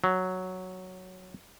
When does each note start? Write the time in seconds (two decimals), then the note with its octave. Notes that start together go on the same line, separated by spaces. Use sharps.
0.04 F#3